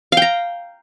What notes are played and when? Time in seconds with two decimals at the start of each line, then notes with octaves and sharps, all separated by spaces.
0.12 F5
0.17 G5
0.22 A#5